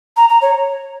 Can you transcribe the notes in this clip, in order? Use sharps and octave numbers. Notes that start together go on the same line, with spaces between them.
A#5
A#5
C#5